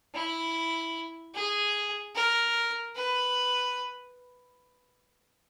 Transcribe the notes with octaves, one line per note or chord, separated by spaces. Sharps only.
E4
G#4
A#4
B4